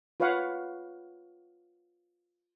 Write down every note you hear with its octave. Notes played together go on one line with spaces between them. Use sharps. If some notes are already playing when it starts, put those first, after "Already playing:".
F4 B4 C#5 F5 F#5